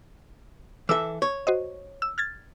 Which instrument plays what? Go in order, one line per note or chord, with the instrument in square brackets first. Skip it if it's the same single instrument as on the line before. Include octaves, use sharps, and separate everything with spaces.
[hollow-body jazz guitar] E3 A4 E5 [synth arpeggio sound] D6 E6
[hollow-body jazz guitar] C#5
[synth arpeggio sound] F#4 C5 D#5
E6
F6 G#6 A6